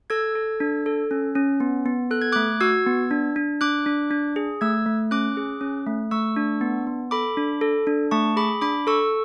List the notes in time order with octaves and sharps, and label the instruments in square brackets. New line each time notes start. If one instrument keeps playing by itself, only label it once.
[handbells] A4 E6 G#6
A4
D4
A4
C#4
C#4
B3
B3
A4 F#6
G#6
A3 D6 F#6
F#4 E6 G#6
B3
D4
D4
D4 D6 F#6
D4
D4
G#4
A3 E6 G#6
A3
C#4 D6 F#6
G#4
C#4
A3
A3 C#6 E6
D4
B3
B3
A4 B5 D6
D4
A4
D4
A3 A5 C#6
G#4 B5 D6
D4 B5 D6
A4 C#6 E6